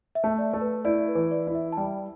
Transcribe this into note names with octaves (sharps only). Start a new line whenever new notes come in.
E5
A3
D5
A3
B4
E4 D5
B4
E3
D5
E4
E5
A5
G3 G5